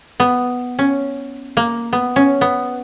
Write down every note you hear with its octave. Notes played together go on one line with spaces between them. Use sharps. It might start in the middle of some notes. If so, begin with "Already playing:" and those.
B3
C#4
A#3
B3
C#4
B3